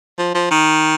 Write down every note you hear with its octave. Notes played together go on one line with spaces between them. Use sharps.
F3
F3
D#3